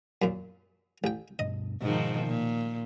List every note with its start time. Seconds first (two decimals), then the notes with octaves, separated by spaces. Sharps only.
0.22 F#2 A#2
1.04 A1 G5
1.39 G2 B2 D4 D#5
1.82 G#2 B2 D#3 F3
2.26 A#2